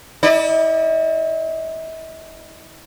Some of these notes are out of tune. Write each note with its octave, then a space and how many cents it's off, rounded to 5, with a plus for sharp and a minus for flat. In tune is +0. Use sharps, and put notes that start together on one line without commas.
E4 -40 D5 +35